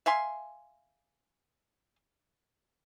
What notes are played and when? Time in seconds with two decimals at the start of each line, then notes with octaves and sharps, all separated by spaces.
0.06 E5 F5 G#5 C6